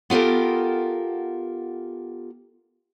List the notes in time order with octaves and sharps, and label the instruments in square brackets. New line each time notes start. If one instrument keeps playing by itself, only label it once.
[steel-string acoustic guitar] B3 F4 G4 A4 A#4